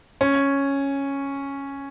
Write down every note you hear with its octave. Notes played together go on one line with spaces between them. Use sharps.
C#4